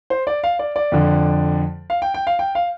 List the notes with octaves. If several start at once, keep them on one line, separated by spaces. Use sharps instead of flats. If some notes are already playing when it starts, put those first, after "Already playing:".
C5
D5
F5
D5
D5
F2 D3
F5
G5
G5
F5
G5
F5